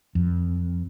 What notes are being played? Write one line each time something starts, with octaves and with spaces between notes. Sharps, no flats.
F2